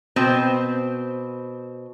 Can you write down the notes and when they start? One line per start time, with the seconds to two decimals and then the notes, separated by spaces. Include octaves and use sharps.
0.16 B2 C4 C5